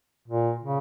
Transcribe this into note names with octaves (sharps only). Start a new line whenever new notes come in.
A#2
C#3